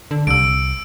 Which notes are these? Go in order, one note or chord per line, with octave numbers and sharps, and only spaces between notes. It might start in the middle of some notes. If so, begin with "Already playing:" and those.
D3
C2 E6 D7